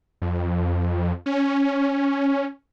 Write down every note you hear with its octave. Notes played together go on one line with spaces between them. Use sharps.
F2
C#4